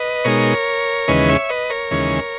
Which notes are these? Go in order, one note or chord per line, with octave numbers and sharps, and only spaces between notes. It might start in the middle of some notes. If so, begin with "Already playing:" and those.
Already playing: B4 D#5
B2 G#3 D#4 A#4 C#5
D#2 C#3 E3 G#3 C#4 B4 D#5
C#5 E5
B4 D#5
A#4 C#5
D#2 C#3 E3 G#3 C#4